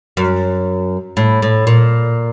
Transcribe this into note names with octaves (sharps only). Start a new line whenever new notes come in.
F#2
A2
A2
A#2